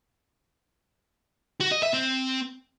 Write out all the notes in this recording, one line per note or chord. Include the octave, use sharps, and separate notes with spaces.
F#4
D#5
E5
C4